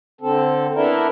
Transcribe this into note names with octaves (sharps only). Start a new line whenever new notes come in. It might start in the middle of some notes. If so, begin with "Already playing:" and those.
D3 C4 A4
B3 D4 E4 A4 A#4